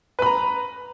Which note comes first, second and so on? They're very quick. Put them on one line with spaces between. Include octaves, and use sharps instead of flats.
B4 B5 A#5